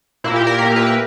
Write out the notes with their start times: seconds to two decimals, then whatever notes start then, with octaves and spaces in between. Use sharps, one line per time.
0.24 A#2 A#3 E4
0.36 G4
0.47 A#4
0.59 A#2 A#3 A#4
0.76 B4
0.86 B4